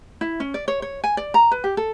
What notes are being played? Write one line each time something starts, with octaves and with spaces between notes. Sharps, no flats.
E4
C#4
D5
C#5
C#5
G#5
D5
A#5
B4
G4
A4